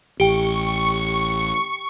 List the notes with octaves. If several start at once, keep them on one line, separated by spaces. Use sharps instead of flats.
A1 G4 G5 C#6